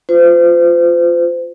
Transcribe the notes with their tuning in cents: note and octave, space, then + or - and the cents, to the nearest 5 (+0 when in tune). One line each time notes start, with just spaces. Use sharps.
F4 +0 C5 -35